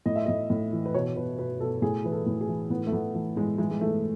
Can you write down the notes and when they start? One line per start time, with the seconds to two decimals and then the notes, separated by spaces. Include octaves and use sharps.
0.06 A2 D#5
0.16 E5
0.26 A2 D#5
0.50 A2
0.73 E3
0.86 B4
0.94 B2 C#5
1.16 B2 B4
1.38 B2 B4
1.60 B2 A4
1.82 A2 G#4
2.04 E3 B4
2.12 A4
2.26 A2
2.41 G#4
2.48 E3
2.70 A2 B3
2.87 A3
2.92 A2 B3
3.14 E3 A3
3.36 A2 G#3
3.58 E3 G#3
3.71 G#3
3.81 E3 A3